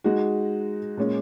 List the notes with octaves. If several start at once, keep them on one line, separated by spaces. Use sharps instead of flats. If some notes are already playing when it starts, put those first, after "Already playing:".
G#3 D#4 F#4
A#2 G#3 C#4